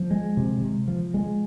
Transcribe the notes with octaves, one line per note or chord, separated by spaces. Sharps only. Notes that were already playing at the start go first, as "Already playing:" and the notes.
Already playing: F3
G#3
C3
C3
F3
G#3